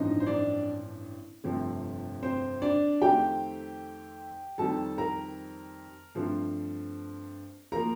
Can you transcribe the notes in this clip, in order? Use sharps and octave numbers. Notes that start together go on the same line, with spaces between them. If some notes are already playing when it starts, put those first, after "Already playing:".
Already playing: A1 G2 D3 F3 C4 D#4 D#5
C5
D4 D5
G1 F2 C3 F3 A3
C4 C5
D4 D5
F2 D#3 A3 C4 G4 G5
F2 D#3 G3 C4 A4 A5
A#4 A#5
G2 F3 A3 C4
F3 A#3 A#4 A#5